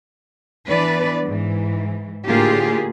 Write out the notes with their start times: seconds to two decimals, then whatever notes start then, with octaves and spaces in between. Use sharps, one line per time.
0.67 E3 B3 D4 B4 D5
1.25 G#2 E3
2.26 A2 D3 A#3 F4 G4 G#4